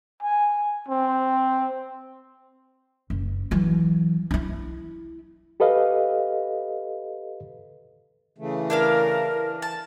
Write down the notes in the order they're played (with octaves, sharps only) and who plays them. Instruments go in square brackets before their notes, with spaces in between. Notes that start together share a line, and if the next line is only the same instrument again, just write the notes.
[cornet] G#5
C4
[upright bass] F#1
E3 F#3
D#4 E4
[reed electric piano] G4 A4 B4 D#5 F5
[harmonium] C#3 E3 A3
[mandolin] D4 E4 F5 [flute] A#4
[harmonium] E3
[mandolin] A5